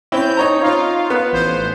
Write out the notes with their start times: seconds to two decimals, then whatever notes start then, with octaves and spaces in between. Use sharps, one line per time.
0.12 C4 C#4 E4 G6
0.37 D#4 C#5 A#5
0.61 D#4 F4 C#5 F5
1.10 B3
1.32 A1 C5